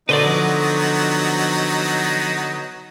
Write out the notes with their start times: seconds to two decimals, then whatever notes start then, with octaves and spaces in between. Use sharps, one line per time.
0.09 D3 F#3 B3 D#4 F#4 B4 C5 D5
0.25 F3